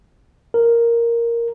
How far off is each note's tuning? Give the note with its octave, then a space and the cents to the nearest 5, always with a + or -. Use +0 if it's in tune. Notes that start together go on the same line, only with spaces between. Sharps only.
A#4 +0